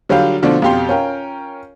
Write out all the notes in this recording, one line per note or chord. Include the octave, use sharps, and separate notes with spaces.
D3 F#3 G3 F4 G4 F5
B2 D3 F3 A3 D4
F2 B2 F4 G4 G5 C6
C#4 F4 A#4 G5